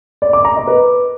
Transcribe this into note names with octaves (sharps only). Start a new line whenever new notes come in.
D5
D6
A#5
D#5
B4